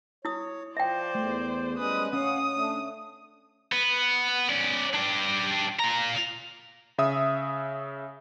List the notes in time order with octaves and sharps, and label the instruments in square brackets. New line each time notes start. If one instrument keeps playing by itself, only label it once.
[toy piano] E4 D#6 [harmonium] C#5
[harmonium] F3 [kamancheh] C5 D5 [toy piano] E5 G5
[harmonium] E2 [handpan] A3
[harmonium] G3 G#3 C#4 [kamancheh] B4 D#6
[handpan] C#4 [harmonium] F5 F#5 [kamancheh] D#6
[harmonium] A3 D4
[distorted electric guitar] B3
C#4 D5
D4 G4
F4 A#5
[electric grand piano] C#3 E5 D#6